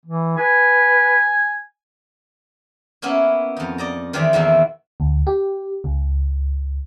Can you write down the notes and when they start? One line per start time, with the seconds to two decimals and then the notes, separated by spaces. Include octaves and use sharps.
0.06 E3
0.37 B4 G#5
3.02 A#3 B3 C#4 E4
3.57 F2 D#4
3.78 D5 D#5 A#5
4.13 D#3 E3 G#3 C4 D5 B5
4.33 E2 A#2 D#3 A3 A#3 E4
5.00 D2
5.27 G4
5.84 C#2